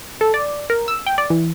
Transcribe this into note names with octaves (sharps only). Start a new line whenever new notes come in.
A4
D5
A#4
E6
G5
D5
E3